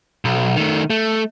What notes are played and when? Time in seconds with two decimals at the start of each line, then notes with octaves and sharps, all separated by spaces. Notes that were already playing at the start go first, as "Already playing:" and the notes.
0.25 B1
0.56 D#3 A3
0.90 A3